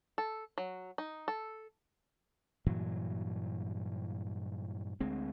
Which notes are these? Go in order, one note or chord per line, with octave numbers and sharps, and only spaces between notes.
A4
F#3
D#4
A4
G2 A#2 E3 F#3
D2 G#3 C4